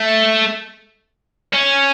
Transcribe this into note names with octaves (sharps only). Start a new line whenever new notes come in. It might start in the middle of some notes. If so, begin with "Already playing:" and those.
Already playing: A3
C#4